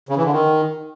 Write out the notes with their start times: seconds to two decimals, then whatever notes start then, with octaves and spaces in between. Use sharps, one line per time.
0.09 C#3
0.17 E3
0.25 D3
0.33 D#3